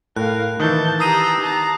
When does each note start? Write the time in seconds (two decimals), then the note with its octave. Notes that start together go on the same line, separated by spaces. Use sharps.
0.16 A2 A#4 F5 F#6
0.60 D#3 E3 A5 G6
1.00 G4 A#5 D#6 E6 C7 D#7
1.43 A5 A#5